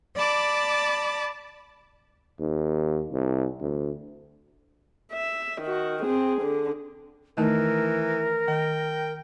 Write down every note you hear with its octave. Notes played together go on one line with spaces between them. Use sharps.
D5 A5 B5 D6
D#2
C2
D2
E5
D#3 F#4
C4 G#4
D3
D#3 E3 A3 D#4 A#4
D#3 G5